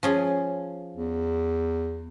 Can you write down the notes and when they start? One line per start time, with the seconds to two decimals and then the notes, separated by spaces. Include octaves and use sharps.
0.03 F3 C#4 G#4
0.96 E2